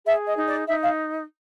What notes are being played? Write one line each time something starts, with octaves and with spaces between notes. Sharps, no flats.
G#4 E5
D#5
D#4
D5
D#4 E5
F5